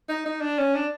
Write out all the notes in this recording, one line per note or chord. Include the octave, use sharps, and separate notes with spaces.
D#4
D#4
D4
C#4
D4